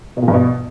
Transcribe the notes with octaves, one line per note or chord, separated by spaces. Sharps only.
B2
A#2
G2
B2